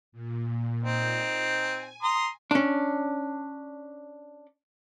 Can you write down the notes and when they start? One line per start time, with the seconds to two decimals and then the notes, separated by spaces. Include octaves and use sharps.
0.12 A#2
0.83 C4 D#4
1.47 G#5
2.02 A#5 C6 D#6
2.51 C#4 D4